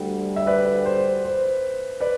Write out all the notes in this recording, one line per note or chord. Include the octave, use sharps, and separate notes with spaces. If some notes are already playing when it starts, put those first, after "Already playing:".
Already playing: D2 D3 G3
E5
B4 D5
C5
C5
B4 D5